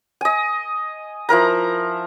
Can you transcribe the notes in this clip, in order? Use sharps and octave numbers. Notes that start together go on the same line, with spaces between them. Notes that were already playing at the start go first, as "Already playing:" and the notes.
D#5 G#5
F3 E4 A#4 A#5